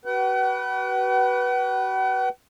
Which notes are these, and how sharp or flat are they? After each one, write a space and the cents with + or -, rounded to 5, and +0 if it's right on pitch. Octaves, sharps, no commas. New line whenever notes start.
F#4 +35 B4 -10 F#5 +45